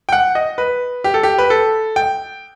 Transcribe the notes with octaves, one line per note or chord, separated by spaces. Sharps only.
G5
F#5
D#5
B4
G4
A4
G4
B4
A4
G5